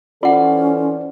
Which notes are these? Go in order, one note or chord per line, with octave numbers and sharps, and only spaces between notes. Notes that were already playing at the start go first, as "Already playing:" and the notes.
E3 C#4 F4 A4 C5 D5 F#5